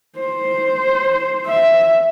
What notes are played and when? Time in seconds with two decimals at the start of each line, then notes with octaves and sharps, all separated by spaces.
0.19 C5
1.46 E5